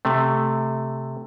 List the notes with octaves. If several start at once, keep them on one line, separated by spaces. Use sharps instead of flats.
C3 A3